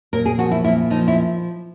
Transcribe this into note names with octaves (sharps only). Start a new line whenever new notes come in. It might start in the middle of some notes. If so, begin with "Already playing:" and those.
A#2 A#4
G#4
F3 F#4
E4
A#2 E4
F3 D#4
E4